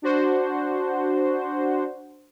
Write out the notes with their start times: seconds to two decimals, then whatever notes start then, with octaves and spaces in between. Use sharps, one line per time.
0.02 D4 F#4 C5